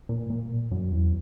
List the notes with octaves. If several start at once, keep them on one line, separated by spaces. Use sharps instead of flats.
A#2
A#2
F#2
E2